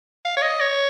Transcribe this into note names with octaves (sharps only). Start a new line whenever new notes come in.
F5
C#5
D#5
C#5